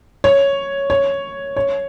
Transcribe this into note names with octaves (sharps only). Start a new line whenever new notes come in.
C#5
C#5
C#5